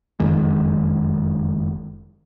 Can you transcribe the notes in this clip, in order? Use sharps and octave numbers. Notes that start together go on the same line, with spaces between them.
F#1 F2 D#3 G#3